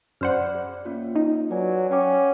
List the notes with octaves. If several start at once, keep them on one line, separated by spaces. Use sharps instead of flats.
F#2 C5 D5 F#5 B5 F6
G#4
A#3 C#4 F4
D#4
F#3 B4 D5 G#5
C#4 F#5 G5 D6